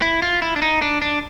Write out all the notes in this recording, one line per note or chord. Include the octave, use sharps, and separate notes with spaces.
E4
F4
E4
D4
D#4
D4
D4